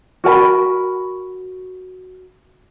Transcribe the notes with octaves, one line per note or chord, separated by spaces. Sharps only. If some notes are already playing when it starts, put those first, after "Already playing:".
F#4 A#4 G#5 B5